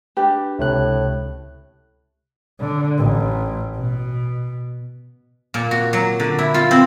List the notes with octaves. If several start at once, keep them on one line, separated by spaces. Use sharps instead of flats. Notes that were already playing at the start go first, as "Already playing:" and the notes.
D4 G4 B4
C#2 A2 C3 F#6
D3
A1
B2
A#2
F#4
F#3
D3
E4
F4
C4